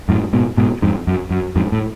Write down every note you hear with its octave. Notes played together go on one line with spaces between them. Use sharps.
F#2 A2
G#2 B2
G#2 B2
F2 G#2
F#2
F#2
F2 G#2
A2